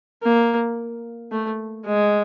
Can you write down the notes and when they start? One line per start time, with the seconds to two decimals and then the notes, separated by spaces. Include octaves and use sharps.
0.23 A#3
1.31 A3
1.85 G#3